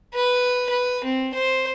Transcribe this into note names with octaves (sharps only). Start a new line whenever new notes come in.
B4
B4
C4
C5